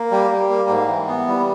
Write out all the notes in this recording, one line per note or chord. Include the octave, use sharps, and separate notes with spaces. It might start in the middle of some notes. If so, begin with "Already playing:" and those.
Already playing: A#3
G3
G3
A#3
G#2
E3
B3
G3